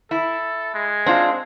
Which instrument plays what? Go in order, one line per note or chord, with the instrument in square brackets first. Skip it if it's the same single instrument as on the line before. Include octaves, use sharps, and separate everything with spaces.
[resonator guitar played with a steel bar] E4 [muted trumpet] A4
[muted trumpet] G#3
[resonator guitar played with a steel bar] C4 D4 F4